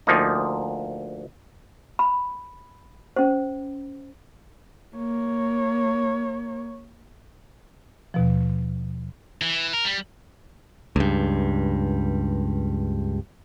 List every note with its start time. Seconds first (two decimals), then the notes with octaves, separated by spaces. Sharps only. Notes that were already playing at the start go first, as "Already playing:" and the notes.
0.07 D2 F3 A#3 D#4
1.99 B5
3.16 C#4 C5
4.96 A#3 C#5
8.14 D#2 B2 F3
9.41 E3
9.73 A#4
9.85 G3
10.96 C#2 G2